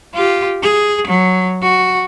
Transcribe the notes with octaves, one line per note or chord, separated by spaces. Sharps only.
F4 G4
G#4
F#3
F#4